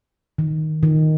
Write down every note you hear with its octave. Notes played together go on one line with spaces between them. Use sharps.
D#3
D#3